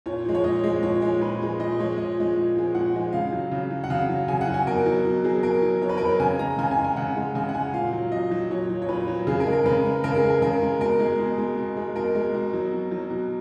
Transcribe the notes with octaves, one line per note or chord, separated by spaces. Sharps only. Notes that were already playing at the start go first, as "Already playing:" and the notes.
A#2 C#5
F3 G#3
C#5
A#2 D#5
F3 G#3
A#2 C#5
F3 G#3
A#2 B4
F3 G#3
A#2 D#5
F3 G#3 C#5
A#2 D#5
F3 G#3
A#2
F3 G#3
A#2 F#5
F3 G#3
C#3 F5
F#3
C#3
F#3
F#5
C#3 F5
F#3
C#3 G#5
F#5
F#3
G#5
B2 A#4
F#3
B2
F#3 G#4
B2 A#4
F#3
B2 C#5
B4
A#4
F#3 B4
C#3 G#5
G#3 A#5
C#3 G#5
G#5
G#3
G#5
C#3 F#5
G#3
C#3 G#5
F#5
G#3 G#5
A#2 F5
F#3
A#2 D#5
F#3
A#2 C#5
F#3
C#5
A#2 B4
F#3
C#3 G#4
A#4
G#3
A#4
C#3 B4
G#3
C#3 A#4
G#4
G#3
A#4
C#3 A#4
G#3
B2 A#4
G#3 G#4
B2
G#3
B2
G#3
B2 A#4
G#3
B2
F#3
B2
F#3
B2